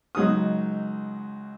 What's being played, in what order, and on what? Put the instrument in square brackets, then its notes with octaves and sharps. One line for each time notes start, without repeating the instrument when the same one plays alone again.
[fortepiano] C#2 F#3 D#4 D#6